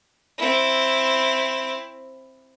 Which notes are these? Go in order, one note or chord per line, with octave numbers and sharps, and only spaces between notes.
C4 E4